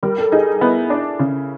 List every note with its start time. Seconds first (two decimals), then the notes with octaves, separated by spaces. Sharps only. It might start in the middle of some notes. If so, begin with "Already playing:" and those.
0.03 G3 A#4
0.18 A4
0.32 D#4 G#4
0.61 B3 E4
0.90 D4
1.19 C#3